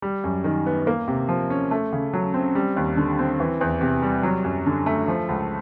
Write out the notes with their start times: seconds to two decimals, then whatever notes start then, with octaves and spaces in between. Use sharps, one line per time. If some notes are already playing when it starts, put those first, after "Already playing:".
0.02 G3
0.24 F#2
0.44 D#3
0.66 B3
0.87 A#3
1.08 C3
1.29 F3
1.50 C#4
1.71 A3
1.92 C#3
2.13 F#3
2.34 C4
2.55 G3
2.76 D#2
2.97 D3
3.19 C4
3.40 E3
3.61 E2
3.81 C3
4.02 G3
4.23 F#3
4.44 F#2
4.66 D3
4.86 A3
5.08 F3
5.29 C#2